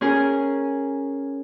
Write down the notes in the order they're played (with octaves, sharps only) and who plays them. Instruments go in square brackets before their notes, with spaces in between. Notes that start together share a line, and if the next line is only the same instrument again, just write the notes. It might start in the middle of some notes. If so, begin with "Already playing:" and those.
[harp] C#4 G#4 A#4